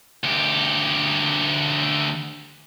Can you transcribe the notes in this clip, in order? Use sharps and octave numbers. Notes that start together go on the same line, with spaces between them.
D2 G4